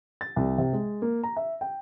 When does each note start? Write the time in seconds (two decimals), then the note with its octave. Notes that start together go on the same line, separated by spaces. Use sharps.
0.21 A6
0.36 C2
0.58 C3
0.73 G#3
1.02 A#3
1.23 A#5
1.37 E5
1.61 G5